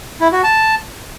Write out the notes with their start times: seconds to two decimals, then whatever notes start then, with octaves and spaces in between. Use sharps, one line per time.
0.21 E4
0.32 F#4
0.43 A5